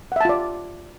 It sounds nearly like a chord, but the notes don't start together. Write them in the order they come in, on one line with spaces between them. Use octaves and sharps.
F#5 E5 A5 F4 D5